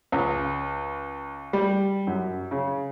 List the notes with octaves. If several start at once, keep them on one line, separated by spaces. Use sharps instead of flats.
C#2
G3
F#2
C#3